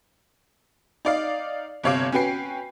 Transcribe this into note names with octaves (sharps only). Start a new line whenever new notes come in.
D#4 D5 F5
G1 C3 C#5 F5 D6
C#4 F#4 B4 G5 C7